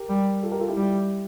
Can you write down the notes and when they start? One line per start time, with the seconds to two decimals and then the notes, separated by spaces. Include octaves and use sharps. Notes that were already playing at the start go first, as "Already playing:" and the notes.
Already playing: G4 A#4
0.09 G3
0.43 F4 A4
0.51 G4 A#4
0.60 F4 A4
0.68 E4 G4
0.77 G3